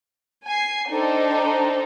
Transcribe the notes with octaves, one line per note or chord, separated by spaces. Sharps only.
G#5 G#6 C7
D4 D#4 A4 C5 G5